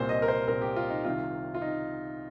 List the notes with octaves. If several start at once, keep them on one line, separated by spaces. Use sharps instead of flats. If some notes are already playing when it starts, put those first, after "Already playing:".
Already playing: C2 A#2 A#3 C5
D#5
A#4
C5
C2 A#2 A#3 A#4
G4
F4
D#4
C2 C3 D#3 F4
F4
D#4